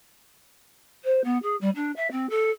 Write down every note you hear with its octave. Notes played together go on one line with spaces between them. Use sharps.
C5
B3
G#4
G3
D4
E5
C4
A4